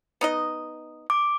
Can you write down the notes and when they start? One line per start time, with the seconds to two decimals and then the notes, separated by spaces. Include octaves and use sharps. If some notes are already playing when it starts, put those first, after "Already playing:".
0.21 B3 D#4 D#5
1.10 D6